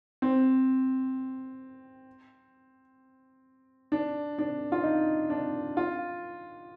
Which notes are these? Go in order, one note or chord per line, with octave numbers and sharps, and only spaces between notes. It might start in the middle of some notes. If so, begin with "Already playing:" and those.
C4
D4
D4
F4
D#4
D4
F4